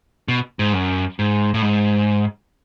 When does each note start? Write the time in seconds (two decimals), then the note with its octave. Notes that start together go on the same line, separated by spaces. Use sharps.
0.28 B2
0.59 G#2
0.73 F#2
1.19 G#2
1.54 A2
1.62 G#2